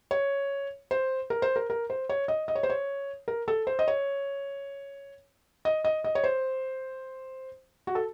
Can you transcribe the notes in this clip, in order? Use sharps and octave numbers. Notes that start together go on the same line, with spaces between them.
C#5
C5
A#4
C5
A#4
A#4
C5
C#5
D#5
D#5
C#5
C5
C#5
A#4
A4
C5
D#5
C#5
D#5
D#5
D#5
C#5
C5
F#4
A4